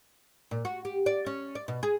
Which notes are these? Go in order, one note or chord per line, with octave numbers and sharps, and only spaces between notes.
A#2
F#4
G4
D5
C#4
D5
B2
G#4